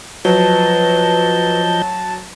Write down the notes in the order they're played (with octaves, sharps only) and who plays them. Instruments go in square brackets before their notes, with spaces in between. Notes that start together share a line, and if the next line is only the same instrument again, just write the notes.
[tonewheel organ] F3 D#5 G6 [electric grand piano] F#3 [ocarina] B4 [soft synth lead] A5